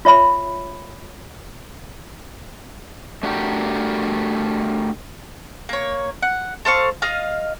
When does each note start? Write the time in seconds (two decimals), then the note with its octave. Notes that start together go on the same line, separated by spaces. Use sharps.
0.05 F4 C#5 E5 B5
3.23 A3 D4 F#4 G4 A#4
5.69 A#3 C#5
6.22 F#5
6.65 A4 C5 F5 C#6
7.02 F4 D#5 F5 F6